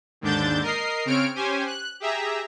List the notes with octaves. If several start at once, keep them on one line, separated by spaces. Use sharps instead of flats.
D#2 G#2 D3 D4 G6 A6
A#4 D#5 C7
C#3 C4 C#5 F6 D7
C#4 G4 C5 G#5
F#6
G4 G#4 E5 A#5